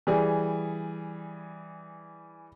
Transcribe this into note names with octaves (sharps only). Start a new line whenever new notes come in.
E3 G3 G#4